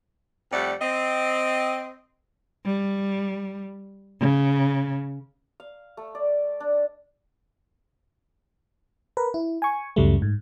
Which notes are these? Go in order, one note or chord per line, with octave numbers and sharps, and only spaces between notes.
F2 G3 A3 D5 F#5
C4 D#5
G3
C#3
F5
A3
D5
D4
A#4 B4
E4
G#5 C#6
C#2 F#2 C#3 F#3 G3 A3
G#2